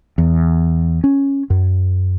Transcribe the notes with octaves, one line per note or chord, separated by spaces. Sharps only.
E2
C#4
F#2